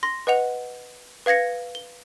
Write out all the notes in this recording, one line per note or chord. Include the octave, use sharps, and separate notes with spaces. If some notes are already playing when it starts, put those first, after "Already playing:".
C6 A#6
B4 D#5 F#5 F7
B4 F5 G#6 A#6 C#7
G7